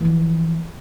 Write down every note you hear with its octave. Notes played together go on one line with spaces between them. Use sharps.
E3 F3